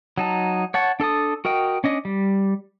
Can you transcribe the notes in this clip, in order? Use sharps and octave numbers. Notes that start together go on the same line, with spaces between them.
F#3 D#4 A5
C#5 F#5 A5 C#6
D4 A4 A5 D#6
F#4 A#4 D#5 G5
C#4 D4 D#5
G3